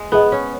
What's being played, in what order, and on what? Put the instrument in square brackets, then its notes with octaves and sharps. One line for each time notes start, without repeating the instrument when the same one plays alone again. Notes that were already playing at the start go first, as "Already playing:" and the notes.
Already playing: [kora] G#3
[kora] B3 [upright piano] G#4 D#5
[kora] C#4